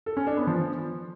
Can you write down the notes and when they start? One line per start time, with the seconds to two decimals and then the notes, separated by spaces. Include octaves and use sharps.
0.06 A4
0.17 C#4
0.27 D4
0.37 B3
0.47 F3